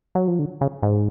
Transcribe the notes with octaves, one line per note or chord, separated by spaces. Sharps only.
F#3
F3
D3
C#3
G#2